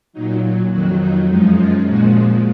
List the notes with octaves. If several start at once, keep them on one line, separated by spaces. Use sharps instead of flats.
A#2 F#3 D#4
F2 D#3 F#3 F#4
D#4
F#2 F3 G#3 D#4
F4
A#2 F3 G#3 F#4